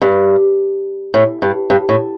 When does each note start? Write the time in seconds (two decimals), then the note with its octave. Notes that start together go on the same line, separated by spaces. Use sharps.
0.02 G2
1.14 A2
1.42 G2
1.70 G2
1.89 A2